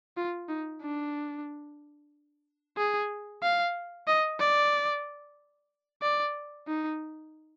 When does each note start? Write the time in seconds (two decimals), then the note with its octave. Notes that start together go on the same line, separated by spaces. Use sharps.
0.17 F4
0.49 D#4
0.82 D4
2.78 G#4
3.43 F5
4.08 D#5
4.39 D5
6.02 D5
6.68 D#4